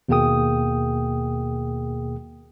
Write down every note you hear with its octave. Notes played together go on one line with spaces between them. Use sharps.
D#2 B2 A#3 G#4 G5 D#6